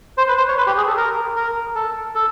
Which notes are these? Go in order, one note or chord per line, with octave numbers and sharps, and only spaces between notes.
C5
B4
C5
C#5
B4
G4
G#4
A4
A#4
A#4
A4
A4